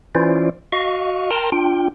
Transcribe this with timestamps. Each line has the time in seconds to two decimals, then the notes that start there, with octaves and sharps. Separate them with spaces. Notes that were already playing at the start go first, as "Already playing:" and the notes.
0.15 E3 C#4 E4 F4 C5 D5
0.72 F#4 D#5 F5 C#6
1.31 A#4 G5 A5 A#5 C6
1.52 D4 F4 G5